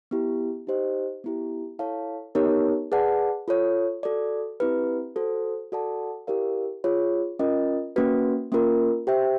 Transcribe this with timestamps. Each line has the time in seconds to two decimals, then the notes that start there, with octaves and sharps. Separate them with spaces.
0.11 B3 E4 G4
0.67 D#4 G4 C5 D#5
1.24 B3 E4 G4
1.79 E4 A4 C#5 F5 A5
2.35 B3 D#4 G4 A#4 C#5
2.92 G#4 B4 D5 F#5 A5
3.48 F4 A4 C#5
4.03 F#4 A4 D5
4.60 C4 E4 G4 B4
5.16 F#4 A4 C5
5.72 F#4 A4 D5 F#5 A5
6.27 E4 G4 A#4 D5 F5
6.84 F4 G#4 C#5
7.39 C#4 F4 A#4 D#5
7.96 A#3 C#4 F#4 B4
8.52 A#3 C#4 F4 A#4
9.07 G4 C5 E5 G5